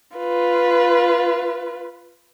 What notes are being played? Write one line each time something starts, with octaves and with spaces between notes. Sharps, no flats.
F4 B4